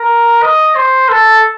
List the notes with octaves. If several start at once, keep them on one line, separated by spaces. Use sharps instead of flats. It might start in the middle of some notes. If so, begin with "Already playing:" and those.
Already playing: A#4
D#5
C5
A4